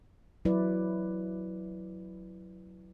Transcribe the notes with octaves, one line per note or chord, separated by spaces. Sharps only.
F#3 E4 B4 D5